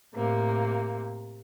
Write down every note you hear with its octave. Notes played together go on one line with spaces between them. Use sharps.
A2 C3 A#3